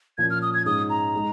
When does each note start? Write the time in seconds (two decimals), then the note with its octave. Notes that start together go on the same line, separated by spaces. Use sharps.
0.18 A#2 F3 C#4 G#6
0.30 F6
0.42 D#6
0.54 G#6
0.65 G#2 G#3 C#4 D#6
0.90 A#5
1.16 G#3 D#4